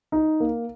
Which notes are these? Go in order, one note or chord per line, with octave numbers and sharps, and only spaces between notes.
D#4
A#3